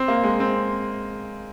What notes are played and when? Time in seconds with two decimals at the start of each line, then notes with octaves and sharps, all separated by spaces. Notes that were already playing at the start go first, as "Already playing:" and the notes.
Already playing: C4
0.08 A#3
0.23 G#3
0.40 C4